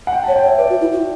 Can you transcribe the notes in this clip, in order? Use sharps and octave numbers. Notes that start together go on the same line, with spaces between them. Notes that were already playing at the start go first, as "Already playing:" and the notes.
F#5
G5
A5
C#5
G5
C#5
E5
B4 D5
F#4
E4
F#4